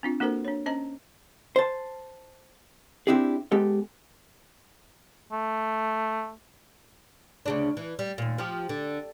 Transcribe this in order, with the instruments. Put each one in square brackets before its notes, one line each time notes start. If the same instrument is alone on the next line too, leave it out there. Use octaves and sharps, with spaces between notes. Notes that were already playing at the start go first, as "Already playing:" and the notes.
[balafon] C4 D4 F4
A#3 D4 F#4 A4 A#4 C5
D4 C#5
C#4 C5 D#5 A5 A#5
[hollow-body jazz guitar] C5 A5
C4 D4 E4 G4 G#4
G#3 B3 G4 A4
[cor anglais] A3
[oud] D2 C#3 D4
E3
G3
D#2 A#2
F3 G4
D3